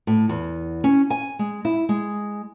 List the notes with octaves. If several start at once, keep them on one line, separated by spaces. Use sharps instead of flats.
A2
E2
C#4
G#5
G#3
E4
G#3